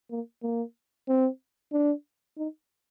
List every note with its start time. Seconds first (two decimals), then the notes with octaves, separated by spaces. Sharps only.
0.11 A#3
0.43 A#3
1.08 C4
1.72 D4
2.37 D#4